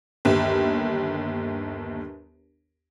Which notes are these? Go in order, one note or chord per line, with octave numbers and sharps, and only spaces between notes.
G1 D#2